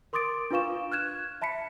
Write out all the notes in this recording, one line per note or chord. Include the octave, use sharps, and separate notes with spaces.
A#4 C6 D6 D#6 A6 D7
D4 F4 B4 F5 C#6 E7
F6 F#6 G#6 E7
E5 A5 B5 B6 C#7